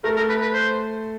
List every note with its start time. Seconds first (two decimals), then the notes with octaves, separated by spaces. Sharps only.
0.04 A3 A#4
0.16 A#4
0.29 B4
0.42 B4
0.53 C5